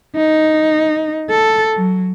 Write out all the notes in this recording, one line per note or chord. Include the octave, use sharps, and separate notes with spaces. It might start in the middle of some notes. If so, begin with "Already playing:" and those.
D#4
A4
F#3